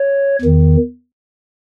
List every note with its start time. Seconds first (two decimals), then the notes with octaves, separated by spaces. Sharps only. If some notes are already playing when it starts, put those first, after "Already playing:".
Already playing: C#5
0.41 E2 D#3